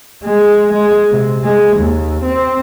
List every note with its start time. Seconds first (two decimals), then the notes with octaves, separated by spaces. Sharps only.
0.24 G#3
0.73 G#3
1.11 C3
1.43 G#3
1.76 D#2
2.23 C4